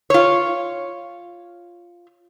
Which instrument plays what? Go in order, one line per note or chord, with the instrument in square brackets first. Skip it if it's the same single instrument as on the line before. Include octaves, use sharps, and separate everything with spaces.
[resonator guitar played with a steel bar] F4 C#5